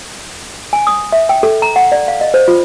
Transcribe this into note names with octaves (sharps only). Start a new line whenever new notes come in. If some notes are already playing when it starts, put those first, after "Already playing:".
G#5
D#6
E5
G5
A4
A#5
F#5
D5
F5
D#5
C5
F4